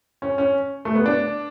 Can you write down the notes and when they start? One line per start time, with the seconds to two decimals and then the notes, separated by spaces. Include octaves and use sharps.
0.22 C#4
0.38 C#4
0.85 A3
0.95 B3
1.06 D4